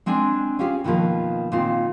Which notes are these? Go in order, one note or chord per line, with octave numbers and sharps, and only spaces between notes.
G#3 C4 D4 G#5
C#4 F4 G4 G#4
B2 D#3 F3 A#3 B4
A#2 D#3 C4 F4